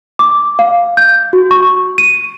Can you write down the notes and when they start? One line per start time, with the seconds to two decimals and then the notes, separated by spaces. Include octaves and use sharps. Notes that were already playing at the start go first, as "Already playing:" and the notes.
0.19 D6
0.59 F5
0.97 G6
1.33 F#4
1.51 C#6
1.98 D#7